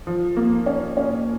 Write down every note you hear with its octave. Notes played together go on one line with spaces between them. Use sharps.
F3
A#3
C#4
C#4